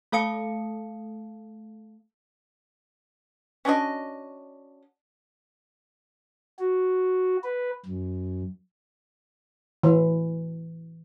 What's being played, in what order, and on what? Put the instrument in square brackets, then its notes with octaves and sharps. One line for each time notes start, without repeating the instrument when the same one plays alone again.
[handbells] A3 A4 F5 A5 D#6 C#7
[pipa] C#4 D4 F#4 D#5
[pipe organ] F#4
B4
F#2
[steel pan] E3